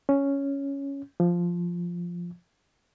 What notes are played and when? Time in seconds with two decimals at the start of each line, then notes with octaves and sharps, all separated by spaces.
0.09 C#4
1.20 F3